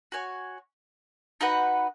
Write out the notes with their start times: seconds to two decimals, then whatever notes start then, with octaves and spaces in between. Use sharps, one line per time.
0.12 F#4 C#5 G#5
1.41 D#4 F#4 B4 F#5